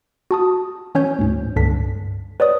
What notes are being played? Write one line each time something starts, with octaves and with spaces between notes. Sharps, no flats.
F#4 A5 D#6
E3 C#4 C#5 G#5 G6
D2 G#2
C#2 G2 D3 D4 B6
B4 C#5 D5 D#6